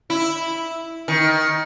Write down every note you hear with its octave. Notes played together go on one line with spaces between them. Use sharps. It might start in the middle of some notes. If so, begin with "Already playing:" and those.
E4
D#3